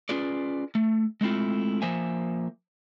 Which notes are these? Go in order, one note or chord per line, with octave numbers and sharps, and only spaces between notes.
C#4 F4 G#4 B4 D5
A3
G#3 A3 C4 E4 F4
F3 A#3 C5 E5 G#5